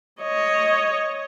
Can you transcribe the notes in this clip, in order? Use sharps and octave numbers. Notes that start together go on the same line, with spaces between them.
C#5 D#5